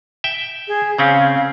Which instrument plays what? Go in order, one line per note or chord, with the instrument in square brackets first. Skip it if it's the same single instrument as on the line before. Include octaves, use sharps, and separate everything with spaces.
[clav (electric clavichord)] E5 G5
[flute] G#4
[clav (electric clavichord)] C#3 C4 C#4 [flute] F5